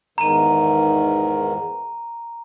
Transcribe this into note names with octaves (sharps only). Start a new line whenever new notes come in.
E2 G#2 D#3 A#5 D#7